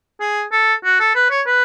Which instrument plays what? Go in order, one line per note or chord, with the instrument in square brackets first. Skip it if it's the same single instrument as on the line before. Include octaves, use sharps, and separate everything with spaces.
[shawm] G#4
A4
F#4
A4
B4
C#5
B4